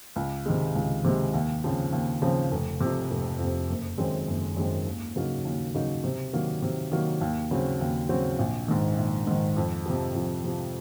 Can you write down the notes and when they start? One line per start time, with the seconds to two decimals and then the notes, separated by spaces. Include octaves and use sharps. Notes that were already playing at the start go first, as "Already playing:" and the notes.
0.16 C#2
0.46 C3 D#3 G#3
0.76 C#2
1.05 C3 D#3 G#3
1.34 D#2
1.64 C#3 F3 C4
1.93 D#2
2.22 C#3 F3 C4
2.52 F1
2.80 F2 C3
3.10 F1
3.39 F2 C3
3.69 F#1
3.98 F#2 D#3 G#3 C4
4.28 F#1
4.57 F#2 D#3 G#3 C4
4.86 D#2
5.16 C#3 F#3 A#3 D#4
5.45 D#2
5.74 C#3 F#3 A#3 D#4
6.04 C3
6.33 D#3 F#3 A#3
6.62 C3
6.91 D#3 F#3 A#3
7.21 D#2
7.51 C#3 F#3 C4
7.81 D#2
8.09 C#3 F#3 C4
8.39 A#1
8.68 G#2 D#3
8.98 A#1
9.27 G#2 D#3
9.57 F2
9.86 C3 F3
10.15 F2
10.44 C3 F3